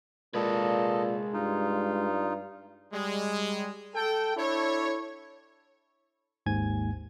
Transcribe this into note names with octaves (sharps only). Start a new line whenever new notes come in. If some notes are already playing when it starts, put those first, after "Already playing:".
A#2 G#3 A4 B4 D#5
G2 D#4 F4
G3 G#3
A4 G5
D4 E4 A4 C#5
G#1 D#2 G#2 G#5 G#6